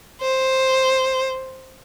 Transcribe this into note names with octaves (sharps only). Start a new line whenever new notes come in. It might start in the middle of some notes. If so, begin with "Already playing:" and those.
C5